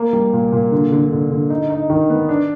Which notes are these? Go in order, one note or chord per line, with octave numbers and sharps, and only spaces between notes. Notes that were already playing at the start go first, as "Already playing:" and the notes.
Already playing: A#3
G3
A#2
A#2
D3
D3
D3
D3
D#4
D#4
D#3
B3
D4